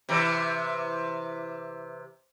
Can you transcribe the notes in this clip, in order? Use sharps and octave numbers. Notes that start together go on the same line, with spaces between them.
C3 E3